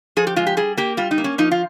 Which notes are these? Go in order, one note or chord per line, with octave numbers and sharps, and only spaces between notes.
F3 G#4
G4
G#3 F4
G4
G3 G#4
A#3 G4
G3 F4
D#4
A#3
C#4
F3 D#4
F4